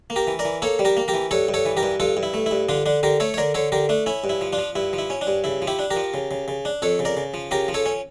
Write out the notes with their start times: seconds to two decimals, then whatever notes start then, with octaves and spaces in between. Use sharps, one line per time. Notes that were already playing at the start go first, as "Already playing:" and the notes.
0.10 A#3
0.16 G4 A#4
0.27 E3
0.39 A#4 D5
0.45 E3
0.62 A#3 A4 C#5
0.79 G3
0.85 G4 A#4
0.97 A#3
1.08 G4 A#4
1.14 E3
1.31 G2 A4 C#5
1.49 G2
1.54 A4 C#5
1.65 E3
1.77 G4 A#4
1.83 G2
2.00 G2 F4 A4
2.17 G2
2.23 E4
2.34 A3
2.46 E4
2.51 G2
2.69 D3 D4 F4
2.86 D3 D4
3.03 D3 G4 A#4
3.20 A3 A4 C#5
3.34 C#5
3.38 D3 A#4 D5
3.54 D3 A4 C#5
3.72 D3 G4 A#4
3.89 A3 D4
4.06 C#4 E4
4.24 G2
4.30 E4
4.41 F3
4.53 D4 F4
4.58 F3
4.76 G2 E4
4.93 F3
4.98 E4
5.10 C#4
5.21 D4
5.27 G2
5.44 C#3 E4
5.62 F3
5.67 E4 G4
5.79 D4
5.91 G4 A#4
5.96 F3
6.14 C#3
6.31 C#3
6.48 C#3
6.65 D4
6.82 F2 A4 C#5
6.99 C#3
7.05 A#4 D5
7.17 C#3
7.34 F3
7.51 C#3 G4 A#4
7.68 F3
7.74 A4 C#5
7.86 C#4